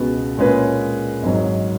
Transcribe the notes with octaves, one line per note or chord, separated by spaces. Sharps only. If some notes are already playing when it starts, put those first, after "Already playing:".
Already playing: C#2 B2 G#3 B3 F#4
A#2 G#3 C#4 G#4 B4
G#1 G#2 F#3